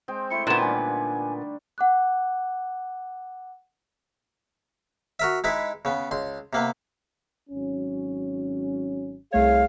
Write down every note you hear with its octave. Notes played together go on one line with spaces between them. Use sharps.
G#3 C4 G5
A3 E4 C6 C#7
A#2 D3 D#3 B3 C#4 E7
G3 D4 G#5
F#5 D6 F#6
F#4 A#4 E5
G#3 D#4 E4 B4
C#3 B3
C#2 C6
C3 A#3 B3
G#1 F#3 C#4
C2 A3 G#4 C#5 F5